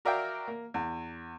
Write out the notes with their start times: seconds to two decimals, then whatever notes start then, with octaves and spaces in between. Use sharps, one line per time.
0.05 F#4 A#4 D5 E5 F5 G5
0.48 A#3
0.74 E2